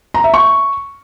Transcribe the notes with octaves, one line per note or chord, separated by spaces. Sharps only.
A#5
E5
C#6